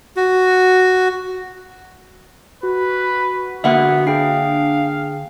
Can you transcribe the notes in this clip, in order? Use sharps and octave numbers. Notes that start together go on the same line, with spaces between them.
F#4
F#4 B4
D3 A#3 B3 B4 E5 F#5
D4 G#4 F5 G5 C7